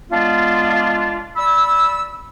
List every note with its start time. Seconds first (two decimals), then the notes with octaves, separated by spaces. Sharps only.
0.10 G#3 B3 D4 F4
1.36 D5 B5 E6